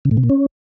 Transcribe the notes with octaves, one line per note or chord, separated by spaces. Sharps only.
C#3
A2
C3
A#2
C#4